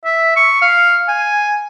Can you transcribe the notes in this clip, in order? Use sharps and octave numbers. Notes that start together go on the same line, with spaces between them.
E5
C#6
F5
G#5